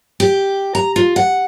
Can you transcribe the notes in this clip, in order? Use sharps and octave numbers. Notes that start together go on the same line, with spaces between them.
G4
A#5
F4
F#5